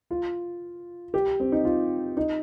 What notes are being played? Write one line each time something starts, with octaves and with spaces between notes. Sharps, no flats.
F4
G4
C4
D#4
F4
D#4